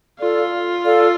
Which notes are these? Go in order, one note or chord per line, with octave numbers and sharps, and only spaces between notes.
F4 A4 D5 F5
A4 D5 F5